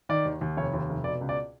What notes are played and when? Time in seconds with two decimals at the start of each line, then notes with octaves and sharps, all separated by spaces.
0.09 D#3 D5
0.25 D#2
0.41 D#2
0.57 F1 C#5
0.74 D#2
0.89 F1
1.04 B2 D5
1.21 C#2
1.29 D5